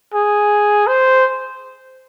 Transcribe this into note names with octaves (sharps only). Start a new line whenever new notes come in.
G#4
C5